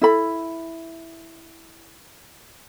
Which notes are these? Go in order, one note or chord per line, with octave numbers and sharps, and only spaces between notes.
E4 A4 B5